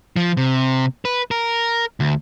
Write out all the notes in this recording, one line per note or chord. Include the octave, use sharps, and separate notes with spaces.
F3
C3
B4
A#4
D2